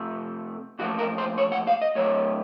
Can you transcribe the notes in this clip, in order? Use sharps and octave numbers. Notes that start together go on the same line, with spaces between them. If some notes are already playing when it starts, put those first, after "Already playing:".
Already playing: C3 F3 A3
A#2 F3 A3 F#4
A#4
C5
C#5
F#5
F5
D#5
A2 F#3 A3 C#5